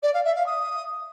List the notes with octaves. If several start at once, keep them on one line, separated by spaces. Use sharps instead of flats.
D5
F5
E5
F5
D#6